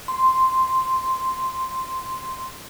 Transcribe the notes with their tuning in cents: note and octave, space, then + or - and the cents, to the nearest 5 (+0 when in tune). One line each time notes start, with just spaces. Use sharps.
C6 -5